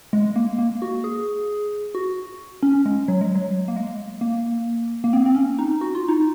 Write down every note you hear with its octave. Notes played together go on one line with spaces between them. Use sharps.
G#3
A#3
A#3
F#4
G#4
F#4
C#4
G#3
F#3
G#3
F#3
A#3
G#3
A#3
A#3
C4
C4
C#4
D#4
F#4
F4
D#4